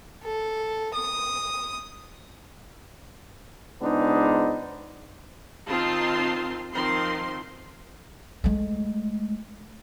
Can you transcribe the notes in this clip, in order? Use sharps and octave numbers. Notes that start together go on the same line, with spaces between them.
A4
D#6
C#2 G#3 B3 D4 D#4 C5
D#3 C4 D#4 F4 A5 C6
D#3 F3 C4 C6
G#3 A3